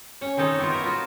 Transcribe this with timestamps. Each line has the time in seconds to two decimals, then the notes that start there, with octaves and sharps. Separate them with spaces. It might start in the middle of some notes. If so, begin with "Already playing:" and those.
0.21 C#4 C#5
0.37 D#3 C4 D#4 A4 C#5
0.59 B3 E4 F4
0.72 A#4 E5
0.84 F4 F#4